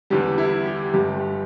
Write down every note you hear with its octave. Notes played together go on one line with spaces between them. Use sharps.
E2 D3 G3 G4
E4
G4
G1 G2 G3 G4